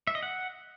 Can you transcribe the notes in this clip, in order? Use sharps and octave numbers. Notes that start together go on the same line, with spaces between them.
E5
D#5
F#5